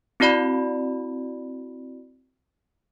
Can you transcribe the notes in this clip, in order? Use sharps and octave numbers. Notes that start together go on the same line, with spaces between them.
C4 E4 F#4 D5 B5